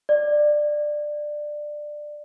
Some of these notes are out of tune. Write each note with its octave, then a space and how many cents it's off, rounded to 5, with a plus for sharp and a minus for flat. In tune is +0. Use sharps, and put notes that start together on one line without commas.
D5 +15